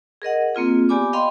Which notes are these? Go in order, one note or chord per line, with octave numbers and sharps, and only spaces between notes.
G#4 A#4 D#5 F#5
A#3 C4 F4 G#4
B3 G4 D5 G#5 B5 D6
D#5 F5 G5 B5 C6